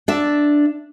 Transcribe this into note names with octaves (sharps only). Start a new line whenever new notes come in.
D4 D5 E5